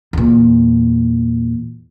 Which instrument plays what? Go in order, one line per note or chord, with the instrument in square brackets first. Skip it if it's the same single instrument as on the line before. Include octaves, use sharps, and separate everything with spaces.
[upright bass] E2 A#2